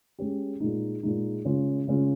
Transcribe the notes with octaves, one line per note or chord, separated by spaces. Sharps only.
G#3 C#4 G4
A#2 G#3 D#4
A#2 G#3 D#4
C#3 G#3 C#4 F4
C#3 G#3 C#4 F4